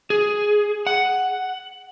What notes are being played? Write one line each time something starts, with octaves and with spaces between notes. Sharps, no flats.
G#4
F#5